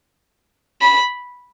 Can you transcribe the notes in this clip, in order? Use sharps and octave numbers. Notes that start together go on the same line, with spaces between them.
B5